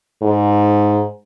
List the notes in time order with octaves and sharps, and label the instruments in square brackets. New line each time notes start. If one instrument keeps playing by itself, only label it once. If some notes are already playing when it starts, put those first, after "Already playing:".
[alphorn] G#2